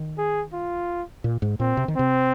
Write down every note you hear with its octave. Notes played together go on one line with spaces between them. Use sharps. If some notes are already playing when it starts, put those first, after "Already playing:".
Already playing: D#3
G#4
F4
A#2
G#2
A#2 C4
C3
D#3
C3 C4